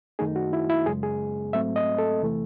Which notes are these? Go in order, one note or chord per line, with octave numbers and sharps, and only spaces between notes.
F#2 D#3 A3 D#4 G#4
F#4
E4
E4
F#2 C#3 G#3 G#4
G#4
G#2 F#3 A3 C4 E5
D#5
A4
E2 C3 E3 A3